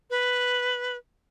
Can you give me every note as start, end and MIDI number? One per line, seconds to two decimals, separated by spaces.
0.10 0.97 71